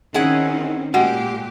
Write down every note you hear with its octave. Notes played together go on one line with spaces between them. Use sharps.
D#3 C4 C#4 E4 G#4 F#5
A#2 G#3 F#4 G4 F#5